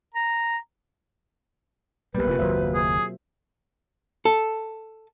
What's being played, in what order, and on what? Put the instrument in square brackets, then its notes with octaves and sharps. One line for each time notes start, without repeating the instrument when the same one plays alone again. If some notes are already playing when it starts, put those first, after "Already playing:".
[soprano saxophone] A#5
[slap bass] B1 G3 [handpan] B2 A#3 G4 [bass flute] B4
[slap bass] F1 C#3 [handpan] C4 F4
[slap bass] F#1 D#2 [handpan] F#3 C5 E5
[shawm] G#4
[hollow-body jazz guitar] A4